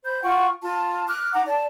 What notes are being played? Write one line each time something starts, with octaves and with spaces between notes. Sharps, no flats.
C5 B5 G6
F4 F#5 G5 C#6
F4 A5
D6 F6 F#6
D#4 F#5 A#5 D6
A4 D5 A5